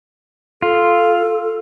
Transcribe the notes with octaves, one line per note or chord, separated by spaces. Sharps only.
F4 A4